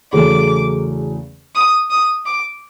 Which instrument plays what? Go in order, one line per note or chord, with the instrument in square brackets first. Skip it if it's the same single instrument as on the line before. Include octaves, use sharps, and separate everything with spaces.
[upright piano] E2 C#3 F#3 A3 C#4 [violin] D6
[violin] D#6
D#6
D6